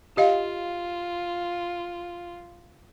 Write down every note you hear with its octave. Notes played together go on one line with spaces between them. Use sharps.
F4 G4 D#5 F5